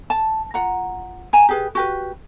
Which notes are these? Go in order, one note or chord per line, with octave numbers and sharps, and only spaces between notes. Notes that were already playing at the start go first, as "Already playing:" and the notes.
A5
F4 F#5 A#5
G#5 A#5
G4 G#4 B4
F#4 G4 B4